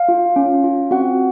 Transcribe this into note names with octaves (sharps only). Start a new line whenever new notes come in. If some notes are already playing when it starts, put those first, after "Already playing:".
Already playing: F5
F4
C#4
F4
C4 F#4 F#5